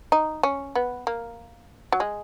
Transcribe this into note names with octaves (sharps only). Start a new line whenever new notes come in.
D#4
C#4
B3
A#3
F#3
G#3